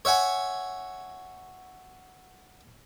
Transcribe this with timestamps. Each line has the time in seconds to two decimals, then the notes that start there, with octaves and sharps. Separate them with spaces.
0.05 C#5 E5 F#5 G#5